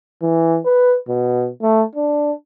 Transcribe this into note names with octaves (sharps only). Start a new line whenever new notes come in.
E3
B4
B2
A3
D4